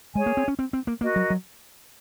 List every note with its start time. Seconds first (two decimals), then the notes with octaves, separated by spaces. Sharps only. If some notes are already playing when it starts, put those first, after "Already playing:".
0.15 G#3 G#4 C#5 G#5
0.26 A#3
0.37 C4
0.48 C#4
0.59 C4
0.73 C4
0.87 A#3
1.01 A#3 F#4 A#4 D#5
1.16 F#3
1.30 F#3